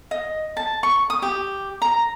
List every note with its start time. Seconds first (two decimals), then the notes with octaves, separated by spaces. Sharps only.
0.11 D#5
0.57 A5
0.83 C#6
1.10 D#6
1.22 G4
1.82 A#5